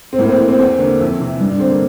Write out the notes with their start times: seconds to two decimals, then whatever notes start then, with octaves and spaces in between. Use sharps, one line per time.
0.13 C4
0.18 A2 A#3
0.29 C4
0.38 E3
0.48 C4
0.58 E2 C4
0.78 D3 A#3
0.99 F2 E4
1.20 C3 E3
1.40 G2
1.50 D4
1.59 D3 C4
1.70 A#3